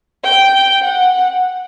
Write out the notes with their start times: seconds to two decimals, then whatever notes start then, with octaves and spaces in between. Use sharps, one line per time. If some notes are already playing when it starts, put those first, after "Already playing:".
0.24 G5
0.82 F#5